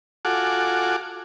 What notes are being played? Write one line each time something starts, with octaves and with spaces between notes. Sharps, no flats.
F4 F#4 A4 F#5 G#5 D6